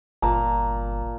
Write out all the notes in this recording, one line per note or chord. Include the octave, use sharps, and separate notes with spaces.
G1 A#2 A5 A#5